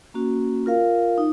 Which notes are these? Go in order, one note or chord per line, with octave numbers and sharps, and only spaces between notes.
A#3 C#4 F#4
F4 A#4 F5
D#4